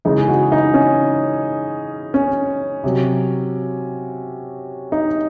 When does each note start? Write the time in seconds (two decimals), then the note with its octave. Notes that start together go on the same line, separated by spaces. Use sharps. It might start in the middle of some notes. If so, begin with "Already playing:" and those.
0.05 C#3 E3 G#3 D#4
0.18 G#4
0.28 F#4
0.52 D#4
0.74 C#4
2.14 C#4
2.84 C3 F#3
4.92 D#4